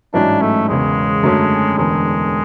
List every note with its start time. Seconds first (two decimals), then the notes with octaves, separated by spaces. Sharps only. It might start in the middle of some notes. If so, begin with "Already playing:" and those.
0.14 A1 G#2 F#3 C#4 D4 E4
0.42 A3
0.68 E1 E2 C#3 G#3
1.23 F#2 D3 F#3 A3 C#4
1.77 E1 E2 D3 G#3